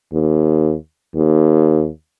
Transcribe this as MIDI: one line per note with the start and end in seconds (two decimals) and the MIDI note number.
0.12 0.75 39
1.15 1.89 39